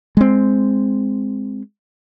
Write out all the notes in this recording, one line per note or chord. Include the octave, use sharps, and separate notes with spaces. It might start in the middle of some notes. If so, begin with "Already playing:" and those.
G#3 C4